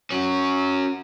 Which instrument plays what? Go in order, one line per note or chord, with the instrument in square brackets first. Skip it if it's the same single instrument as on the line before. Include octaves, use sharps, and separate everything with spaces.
[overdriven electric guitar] C#4 F#4